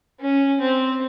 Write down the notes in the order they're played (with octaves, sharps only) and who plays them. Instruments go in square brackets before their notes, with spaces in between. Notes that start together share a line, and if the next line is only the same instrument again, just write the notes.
[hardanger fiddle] C#4
C4